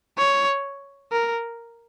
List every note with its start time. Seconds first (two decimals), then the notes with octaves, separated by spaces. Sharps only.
0.18 C#5
1.12 A#4